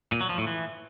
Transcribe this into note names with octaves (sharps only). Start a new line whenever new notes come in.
A#2
F#3
F3
A2
E3